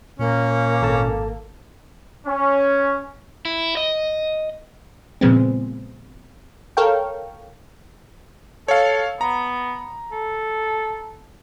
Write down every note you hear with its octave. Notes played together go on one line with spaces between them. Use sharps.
A#2 A#3 C#4
G#1 A4 A5
C#4
E4
D#5
A#2 C#3 F3 G#3 B3 C4
A4 A#4 C#5 F5 G5
A4 C#5 F5
B3 A#5
A4